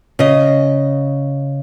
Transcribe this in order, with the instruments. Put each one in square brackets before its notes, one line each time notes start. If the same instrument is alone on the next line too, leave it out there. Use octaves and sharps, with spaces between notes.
[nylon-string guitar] C#3 D#5